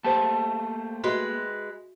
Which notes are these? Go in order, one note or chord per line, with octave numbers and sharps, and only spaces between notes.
A3 A#3 G4 C5 A5
G#3 F#4 B4 E5